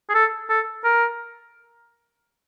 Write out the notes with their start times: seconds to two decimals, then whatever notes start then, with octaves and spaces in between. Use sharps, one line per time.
0.09 G#4
0.14 A4
0.49 A4
0.84 A#4